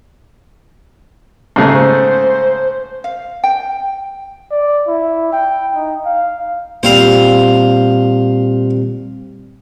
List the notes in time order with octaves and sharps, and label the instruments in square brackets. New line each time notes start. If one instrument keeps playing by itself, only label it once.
[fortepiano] G#2 C#3 A3
[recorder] C5
[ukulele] F5
G5
[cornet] D5
E4
G5
D#4
F5
[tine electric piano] A#2 G3 C4 [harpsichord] C5 F5